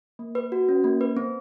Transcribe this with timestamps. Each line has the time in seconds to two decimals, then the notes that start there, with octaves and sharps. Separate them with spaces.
0.19 A#3
0.35 B4
0.52 F#4
0.69 C#4
0.84 A#3
1.01 B4
1.17 C4